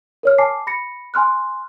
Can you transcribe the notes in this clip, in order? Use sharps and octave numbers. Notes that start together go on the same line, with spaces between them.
A#4 C#5 F6
G#5 A5 D6 C7
B5 A#6 C#7
G#5 C6 F6 F#6